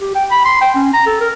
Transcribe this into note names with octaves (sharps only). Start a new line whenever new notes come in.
G4
G5
B5
C6
G5
C#4
A#5
A4
A#4